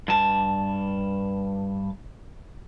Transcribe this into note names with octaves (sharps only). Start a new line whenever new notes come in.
G2 A5